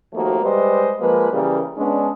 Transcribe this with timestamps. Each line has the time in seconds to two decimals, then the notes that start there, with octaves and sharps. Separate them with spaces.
0.13 D#2 F3 A3 A#3 F#4
0.43 G3 G#3 B4 C5 D#5
1.00 F3 G#3 A#3 B4
1.32 C#3 E3 G3 A#3
1.77 G#3 B3 C#4 D4